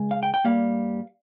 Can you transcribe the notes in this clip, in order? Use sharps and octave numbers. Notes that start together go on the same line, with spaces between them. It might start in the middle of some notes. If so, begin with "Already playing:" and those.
Already playing: C#2 C#3 G#3
F5
G5
G5
G2 G3 A#3 F5